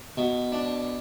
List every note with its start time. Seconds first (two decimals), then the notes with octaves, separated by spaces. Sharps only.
0.18 B2
0.52 D4